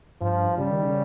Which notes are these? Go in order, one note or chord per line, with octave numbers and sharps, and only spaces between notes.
G2 F3
C#3 G3
D#3
C#3